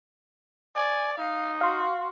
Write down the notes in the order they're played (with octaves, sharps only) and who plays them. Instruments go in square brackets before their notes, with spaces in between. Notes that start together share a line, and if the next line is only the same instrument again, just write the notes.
[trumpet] D5 [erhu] G#5
[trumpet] D#4 [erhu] F5
[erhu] F#4 [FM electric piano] F5 C6